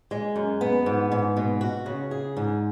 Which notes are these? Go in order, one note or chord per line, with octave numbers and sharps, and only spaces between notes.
G#3
F#2
B3
G#2
G#2
B2
F#4
C#3
G#4
G#2